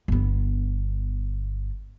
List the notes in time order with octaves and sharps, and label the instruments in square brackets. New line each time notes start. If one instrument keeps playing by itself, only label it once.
[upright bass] G1 B3